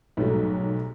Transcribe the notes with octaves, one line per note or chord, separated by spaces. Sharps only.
B1 G#2 F#3 G3 A3